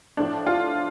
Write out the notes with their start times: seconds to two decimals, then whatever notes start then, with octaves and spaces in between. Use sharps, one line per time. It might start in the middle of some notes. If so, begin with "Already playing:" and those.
0.17 A2 F3 A3 D4
0.47 F4